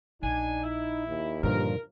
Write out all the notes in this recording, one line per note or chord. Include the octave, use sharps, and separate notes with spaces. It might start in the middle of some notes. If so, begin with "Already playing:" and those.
A#1 D4 D#4 G#5
E4
D#2
G2 A#2 D3 F3 A#4